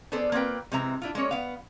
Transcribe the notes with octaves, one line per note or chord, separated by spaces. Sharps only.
B3 G#4 A4 C5 D5
A#3 C4 F4 B4 G5
C3 E3 G#3 C4 E5 A#5
D4 E4 F4
G#3 A#3 C#4 C#5
B3 F5